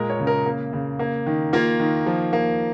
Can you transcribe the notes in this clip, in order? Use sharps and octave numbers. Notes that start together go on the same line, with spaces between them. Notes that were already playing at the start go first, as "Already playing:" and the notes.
Already playing: A#2 G#3 A#4
C#5
C#3
A#4
A#3
C#3
A#3
D#3
A#3 F4
D#3
F3
A#3